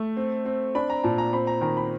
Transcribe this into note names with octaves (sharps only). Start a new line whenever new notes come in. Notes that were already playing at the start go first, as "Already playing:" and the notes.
Already playing: A3
C4
C4
D4 B5
A#5
A#2 A5
A#5
C4 B5
A#5
D#3 A#5
B5